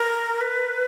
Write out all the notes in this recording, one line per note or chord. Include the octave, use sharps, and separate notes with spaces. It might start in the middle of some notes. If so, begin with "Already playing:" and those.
Already playing: A#4
B4